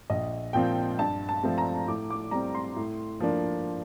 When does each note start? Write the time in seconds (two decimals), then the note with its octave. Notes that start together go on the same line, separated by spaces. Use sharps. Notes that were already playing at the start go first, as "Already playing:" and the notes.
0.10 A#1 D#5
0.53 A#2 F3 C4 G5
0.99 G2 A5
1.29 A5
1.43 F3 A3 C4
1.58 A#5
1.88 A2 D6
2.10 D6
2.31 G3 C4 A#5
2.55 C6
2.76 A2
3.20 F3 A#3 D4